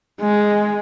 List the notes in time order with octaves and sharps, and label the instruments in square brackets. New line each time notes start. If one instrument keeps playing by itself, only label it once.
[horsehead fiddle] G#3